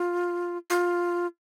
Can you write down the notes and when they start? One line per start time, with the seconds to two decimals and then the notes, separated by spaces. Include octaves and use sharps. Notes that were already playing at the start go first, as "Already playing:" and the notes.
Already playing: F4
0.70 F4